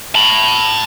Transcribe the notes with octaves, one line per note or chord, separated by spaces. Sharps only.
A5 B5